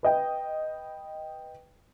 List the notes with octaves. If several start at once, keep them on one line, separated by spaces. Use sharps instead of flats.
B4 D#5 G5